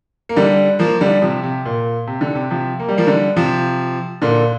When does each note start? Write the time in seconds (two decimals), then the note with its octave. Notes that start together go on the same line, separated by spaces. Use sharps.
0.29 A#3
0.36 D3 G3
0.79 F3 A#3
1.01 D3 G3
1.22 C3 F3
1.43 C3
1.66 A#2
2.07 C3
2.21 D3
2.35 C3
2.50 C3 F3
2.80 A#3
2.89 G3
2.98 F3 A#3
3.07 D3 G3
3.36 C3 F3
4.22 A#2 D3